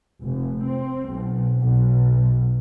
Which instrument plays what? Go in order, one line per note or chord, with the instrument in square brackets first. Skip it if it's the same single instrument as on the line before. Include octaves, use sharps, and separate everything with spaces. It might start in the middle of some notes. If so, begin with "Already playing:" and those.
[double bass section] F1
C4
B1
B1